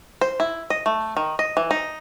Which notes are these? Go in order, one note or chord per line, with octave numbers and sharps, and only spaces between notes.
C5
E4
D#5
A3
D#3
D#5
E3
D#4